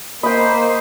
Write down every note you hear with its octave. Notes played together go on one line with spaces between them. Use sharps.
A#3 C5 D#5 G5 B5